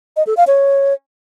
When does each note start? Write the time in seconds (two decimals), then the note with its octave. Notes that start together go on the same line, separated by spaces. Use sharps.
0.17 D#5
0.27 A4
0.37 F5
0.47 C#5